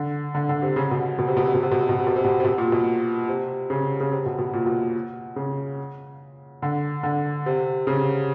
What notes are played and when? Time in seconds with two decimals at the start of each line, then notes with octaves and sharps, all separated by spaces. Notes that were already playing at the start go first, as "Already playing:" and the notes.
Already playing: D3
0.35 D3
0.49 D3
0.62 C3
0.76 C#3
0.91 B2
1.19 B2
1.27 C3
1.37 B2
1.45 C3
1.54 B2
1.63 C3
1.71 B2
1.80 C3
1.89 B2
1.99 C3
2.07 B2
2.16 C3
2.24 B2
2.40 C3
2.45 B2
2.58 A#2
2.72 B2
3.28 C3
3.70 C#3
4.00 C#3
4.11 C3
4.26 B2
4.38 B2
4.53 A#2
4.66 B2
5.36 C#3
6.62 D3
7.03 D3
7.46 C3
7.87 C#3